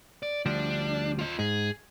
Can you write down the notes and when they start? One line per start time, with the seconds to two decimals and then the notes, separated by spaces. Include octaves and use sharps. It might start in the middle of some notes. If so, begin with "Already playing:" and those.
0.23 D5
0.46 D2 F3 G3 D4
1.19 F4 D#5
1.39 G#2 G#4